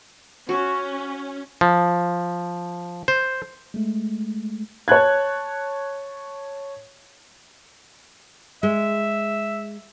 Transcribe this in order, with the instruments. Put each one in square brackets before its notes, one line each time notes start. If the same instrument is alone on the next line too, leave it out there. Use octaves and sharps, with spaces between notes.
[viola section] C#4 [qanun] F#4
[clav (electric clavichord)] F3
C5
[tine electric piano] G#3 A3
[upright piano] C#5 A5 F#6 G#6
[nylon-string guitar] G#3 [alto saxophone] E5